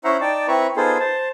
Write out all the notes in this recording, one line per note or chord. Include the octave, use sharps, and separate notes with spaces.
C#4 E4 C5 E5 F#5 A#5
D#4 D5 G5 A5
C4 E4 B4 A#5 C#6
B3 D#4 F4 G#4 A4 C5
C5 A5